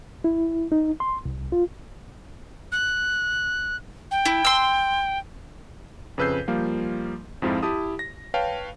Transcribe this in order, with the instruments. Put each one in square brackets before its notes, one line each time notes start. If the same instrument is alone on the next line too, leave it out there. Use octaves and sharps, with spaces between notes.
[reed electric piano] E4
D#4
C6
C2
F4
[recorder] F#6
G5
[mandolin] E4
C6 E6
[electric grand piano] F2 C#3 B4 E6 G6 C7
F3 G3 A#3 F4
F2 G#2 F3 C4 E4 F4
E4 G4 A5 D#6
A#6
B4 C#5 F5 G5 A5